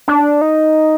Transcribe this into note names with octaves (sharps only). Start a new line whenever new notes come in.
D4
D#4